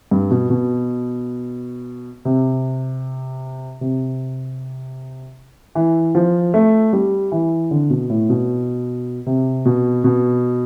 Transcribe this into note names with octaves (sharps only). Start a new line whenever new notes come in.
G2
B2
B2
C3
C3
E3
F3
A3
G3
E3
D3
B2
A2
B2
C3
B2
B2